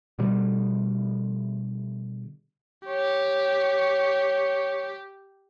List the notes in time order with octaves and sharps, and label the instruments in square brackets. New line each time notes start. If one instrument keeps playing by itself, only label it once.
[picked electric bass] B2 D3 G3
[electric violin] G4 [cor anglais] C#5